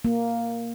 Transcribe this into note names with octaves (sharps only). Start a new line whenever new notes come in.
A#3